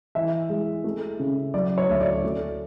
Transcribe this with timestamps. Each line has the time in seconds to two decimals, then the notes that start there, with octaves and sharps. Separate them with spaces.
0.15 E3 E5
0.50 G#3
0.84 A3
1.19 C#3
1.54 F#3 D5
1.78 C#5
1.89 D2 E5
2.00 D5
2.23 A3